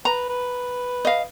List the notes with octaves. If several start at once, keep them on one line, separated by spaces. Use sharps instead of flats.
B4 A#5
B4
D#5 F5